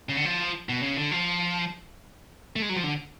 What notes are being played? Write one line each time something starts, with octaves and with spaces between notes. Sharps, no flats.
C#3
D3
F3
B2
C#3
D3
F3
A3
G#3
F#3
F3
D3